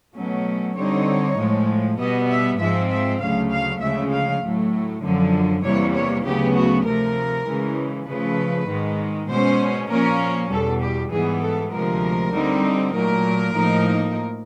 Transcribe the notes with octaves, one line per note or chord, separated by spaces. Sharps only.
B2 F#3 A3 C#4
D3 G3 C4 D#4 C#5
A2 F3 G#3
B2 G3 B3 D#5
E5
G#2 F3 G#3 C4 E5
E5
D2 C#3 F#3 A3 F5
F5
D2 C#3 F3 G#3 E5
F5
A2 F#3 A3
F#2 D3 F3
E2 C3 E3 G3 A#3 C#5
C#5
D2 C#3 F#3 B3 G4
F#4
C3 F3 A3 A#4
C#3 E3 G#3
C#3 F3 A3 B4
G#2 D#3 G#3
B2 G#3 C#4 C5
A#2 F3 A#3 C#4 A#4
E2 B2 G3 A4
G4
G#2 E3 G3 B3 G#4
A4
D2 C3 F3 G#3 A#4
D3 G3 C4 D#4
A#2 F#3 A3 A#4
A2 F3 A#3 D#4